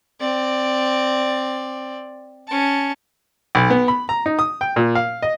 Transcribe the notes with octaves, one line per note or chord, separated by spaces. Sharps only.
C4 D5
C#4 A5
B1
B3
B5
A#5
D#4
D#6
G5
A#2
F5
D#5